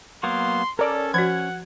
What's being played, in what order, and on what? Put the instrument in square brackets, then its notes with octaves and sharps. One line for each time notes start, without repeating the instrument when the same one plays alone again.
[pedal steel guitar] F#3 A#3 B3 [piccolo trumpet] C6
[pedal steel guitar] C#4 [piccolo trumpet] A4 [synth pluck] A#4 D5
[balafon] F3 F#4 [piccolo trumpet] F#5 [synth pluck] G#6